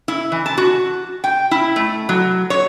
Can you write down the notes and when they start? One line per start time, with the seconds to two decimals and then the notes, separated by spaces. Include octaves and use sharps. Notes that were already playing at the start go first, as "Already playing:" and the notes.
0.08 E4
0.32 E3
0.46 A5
0.58 F#4
1.24 G5
1.51 E4
1.76 A3
2.09 F#3
2.50 C#5